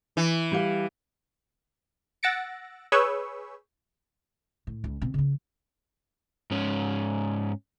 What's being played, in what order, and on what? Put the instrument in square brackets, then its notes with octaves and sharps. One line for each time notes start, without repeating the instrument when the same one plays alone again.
[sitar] E3
[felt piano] G3 G4 F5
[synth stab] F#5 E6 A6 A#6 C#7 D7
G#4 B4 C#5 C#6 E6 G6
[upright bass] A2
C#2
B2 C4
C#3 F3
[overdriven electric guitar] G#2 C#4